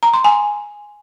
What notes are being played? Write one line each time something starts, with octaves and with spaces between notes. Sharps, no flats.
A#5
C6
G#5